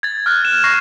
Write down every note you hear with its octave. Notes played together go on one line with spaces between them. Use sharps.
G#6 A6
F6 F#6 A6
E7
C#6 A#6 C7